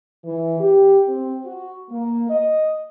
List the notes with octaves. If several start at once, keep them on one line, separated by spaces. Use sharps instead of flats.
E3
G4
C4
F#4
A#3
D#5